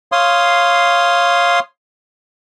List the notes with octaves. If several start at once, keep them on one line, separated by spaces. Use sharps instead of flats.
C#5 F5 C6 D#6